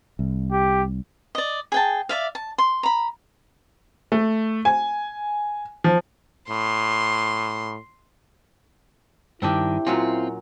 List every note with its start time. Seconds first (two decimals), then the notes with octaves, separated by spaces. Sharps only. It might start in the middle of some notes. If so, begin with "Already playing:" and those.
0.19 C2
0.52 G4
1.35 D5 D#5
1.72 G#4 G5 A5
2.09 D5 E5 F5
2.35 A5
2.58 C6
2.83 A#5 B5
4.12 A3
4.65 G#5
5.84 F3
6.50 A2 C6
9.42 G2 D#3 C4 D4 E4 G4
9.87 A#2 F#3 C4 C#4 F4